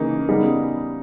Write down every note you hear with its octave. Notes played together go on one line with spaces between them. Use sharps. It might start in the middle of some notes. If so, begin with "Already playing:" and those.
Already playing: C#3 E3 A#3 D#4
C#3 G3 B3 D#4 G#4